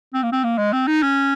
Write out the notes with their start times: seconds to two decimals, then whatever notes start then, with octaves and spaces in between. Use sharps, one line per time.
0.14 C4
0.23 A#3
0.32 C4
0.44 A#3
0.58 G#3
0.73 C4
0.87 D#4
1.03 C#4